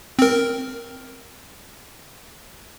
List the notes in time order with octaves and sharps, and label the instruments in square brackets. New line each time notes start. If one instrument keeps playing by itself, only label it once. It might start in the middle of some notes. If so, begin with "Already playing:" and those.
[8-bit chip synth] C4 A#4